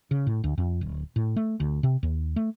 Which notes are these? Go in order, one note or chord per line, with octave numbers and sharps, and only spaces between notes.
C#3
A2
D2
F2
D1
A2
A3
D2
C3
D#2
A3